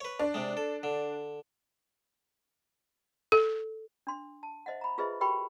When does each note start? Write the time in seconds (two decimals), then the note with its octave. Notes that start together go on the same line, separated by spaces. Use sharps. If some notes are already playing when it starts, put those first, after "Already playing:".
0.01 B4 C#5
0.19 D4
0.34 C3 G#3
0.57 A4
0.83 D3
3.32 A4
4.07 D4 C6
4.43 A5
4.66 C5 D#5 E5 F#5
4.81 A#5 B5
4.98 F4 G#4 B4 C5 D#5 E5
5.21 F#4 G4 A#4 G5 B5 C#6